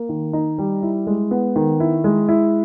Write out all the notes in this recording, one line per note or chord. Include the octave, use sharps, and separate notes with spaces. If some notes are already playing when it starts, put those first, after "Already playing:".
Already playing: A#3
D#3
D#4
G3
E4
G#3
B3
D#3
E4
G#3
E4